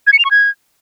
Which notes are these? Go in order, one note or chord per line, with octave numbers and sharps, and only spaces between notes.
G#6
C#7
F7
C#6
G#6